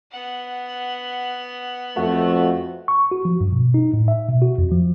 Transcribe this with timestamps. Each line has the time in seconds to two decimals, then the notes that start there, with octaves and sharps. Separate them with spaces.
0.11 B3 F#5
1.97 F2 A3 F#4
2.88 C#6
3.11 F#4
3.25 F3
3.41 G2
3.52 B2
3.74 D#4
3.94 A2
4.08 E5
4.28 B2
4.42 F#4
4.58 F2
4.72 F3